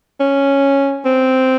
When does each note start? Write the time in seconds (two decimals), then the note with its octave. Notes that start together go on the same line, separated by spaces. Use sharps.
0.20 C#4
1.05 C4